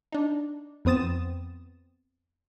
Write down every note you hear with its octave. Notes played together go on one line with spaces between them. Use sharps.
D4 D#4
F2 B3 C4 D#6 A6 E7